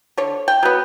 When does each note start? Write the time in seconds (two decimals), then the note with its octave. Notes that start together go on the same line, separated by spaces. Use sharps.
0.17 D3 C#5
0.48 G5
0.63 F#3 B3